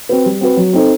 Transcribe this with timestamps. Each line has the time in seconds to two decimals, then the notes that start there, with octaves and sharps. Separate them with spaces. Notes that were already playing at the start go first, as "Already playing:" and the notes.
0.09 C4 F#4 B4
0.26 G3
0.41 C4 F#4 B4
0.57 F#3
0.73 C4 D#4 A4 C5